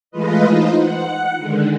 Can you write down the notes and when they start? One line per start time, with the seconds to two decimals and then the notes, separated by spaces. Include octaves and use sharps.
0.11 E3 G#3 A3 F4 B4 D#5
0.47 D#4 F4 C5
0.77 F#5
1.36 D3 D#3 G#3